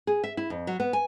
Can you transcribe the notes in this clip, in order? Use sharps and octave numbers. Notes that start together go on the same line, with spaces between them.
G#4
E5
E4
F2
F#3
B3
G#5